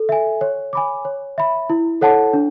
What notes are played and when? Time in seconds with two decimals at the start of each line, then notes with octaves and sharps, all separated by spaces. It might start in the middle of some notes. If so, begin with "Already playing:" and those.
Already playing: A4
0.09 E5 G#5
0.41 C#5
0.73 G#5 B5 D6
1.05 C#5
1.38 E5 B5
1.70 E4
2.01 A4 C#5 F#5 A5
2.33 D4